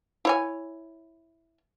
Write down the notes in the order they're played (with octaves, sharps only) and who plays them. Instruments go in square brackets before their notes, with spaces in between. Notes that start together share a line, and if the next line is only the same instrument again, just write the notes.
[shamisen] E4 C#5 G#5